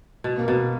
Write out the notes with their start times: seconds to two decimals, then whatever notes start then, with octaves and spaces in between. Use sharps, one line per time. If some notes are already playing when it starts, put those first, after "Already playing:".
0.24 B2
0.38 A#3
0.48 B2 B3